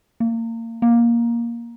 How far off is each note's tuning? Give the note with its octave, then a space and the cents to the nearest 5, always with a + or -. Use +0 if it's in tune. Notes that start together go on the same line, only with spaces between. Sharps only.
A#3 -30
A#3 +10